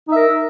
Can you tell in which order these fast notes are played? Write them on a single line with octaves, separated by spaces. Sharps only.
D#4 E5 A#4